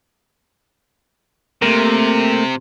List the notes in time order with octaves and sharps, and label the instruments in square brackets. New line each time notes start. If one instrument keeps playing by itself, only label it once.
[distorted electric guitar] C3 [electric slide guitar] A3 A#3 A#4